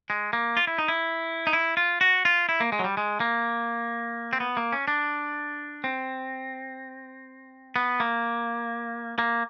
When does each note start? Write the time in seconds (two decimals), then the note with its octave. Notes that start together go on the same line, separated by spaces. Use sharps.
0.10 G#3
0.33 A#3
0.57 F4
0.67 E4
0.78 D#4
0.88 E4
1.47 D#4
1.53 E4
1.77 F4
2.01 F#4
2.25 F4
2.49 E4
2.60 A#3
2.72 G#3
2.79 F#3
2.84 G3
2.97 G#3
3.20 A#3
4.33 C4
4.40 B3
4.57 A#3
4.72 C#4
4.88 D4
5.84 C4
7.76 B3
8.00 A#3
9.18 A#3